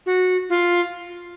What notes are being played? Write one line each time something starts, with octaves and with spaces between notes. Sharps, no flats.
F#4
F4